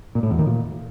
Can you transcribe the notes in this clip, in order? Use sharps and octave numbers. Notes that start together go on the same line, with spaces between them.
A#2
A2
E2
D#3
A#2